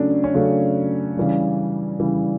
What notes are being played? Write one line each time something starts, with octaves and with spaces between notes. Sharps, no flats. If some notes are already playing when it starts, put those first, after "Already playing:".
Already playing: C#3 F#3 A3 C#4 D4
C#4
C#3 F#3 A3 D4
C#3 E3 G3
C#3 E3 G3